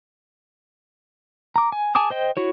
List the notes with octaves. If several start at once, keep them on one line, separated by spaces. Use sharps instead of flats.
A#5 D6
G#5
G#4 G#5 A5 D6 D#6
C5 D#5 G5
E4 F#4 C#5